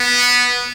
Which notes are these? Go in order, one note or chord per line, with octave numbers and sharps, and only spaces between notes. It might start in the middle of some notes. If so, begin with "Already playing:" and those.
Already playing: B3